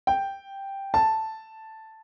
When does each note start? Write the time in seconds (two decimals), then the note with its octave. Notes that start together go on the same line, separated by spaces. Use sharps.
0.07 G5
0.94 A5